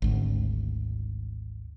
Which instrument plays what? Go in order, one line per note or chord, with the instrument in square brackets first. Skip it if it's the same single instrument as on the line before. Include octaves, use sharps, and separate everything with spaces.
[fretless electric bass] G#1 D2